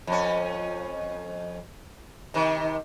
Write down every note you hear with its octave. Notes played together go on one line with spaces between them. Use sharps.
F2 C#4
C3 D#3